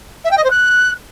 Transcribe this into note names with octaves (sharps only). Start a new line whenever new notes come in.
E5
G5
D#5
C5
F#6